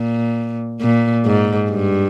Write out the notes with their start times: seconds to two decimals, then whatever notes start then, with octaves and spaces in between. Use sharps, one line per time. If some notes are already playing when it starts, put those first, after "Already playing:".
Already playing: A#2
0.81 A#2
1.26 G#2
1.71 G2